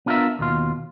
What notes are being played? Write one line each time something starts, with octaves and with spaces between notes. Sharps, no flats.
B3 D4 F4 G#4 A#4 E5
D#2 B2 F4